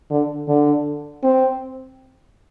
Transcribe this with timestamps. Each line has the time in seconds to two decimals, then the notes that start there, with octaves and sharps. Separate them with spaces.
0.10 D3
0.48 D3
1.23 C4